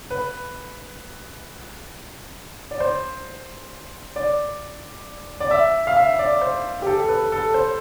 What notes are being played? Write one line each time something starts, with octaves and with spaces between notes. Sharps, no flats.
B4
D5
C5
D5
D5
E5
F5
E5
D5
C5
G4
A4
A4
B4
A4
C5